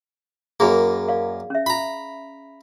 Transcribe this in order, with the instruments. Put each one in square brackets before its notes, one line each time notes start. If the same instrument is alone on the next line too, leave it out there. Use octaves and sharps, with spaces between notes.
[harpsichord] F#2 A#3 [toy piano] G#4 B5
[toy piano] D5 F5
C#4 E5
[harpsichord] A#5 B5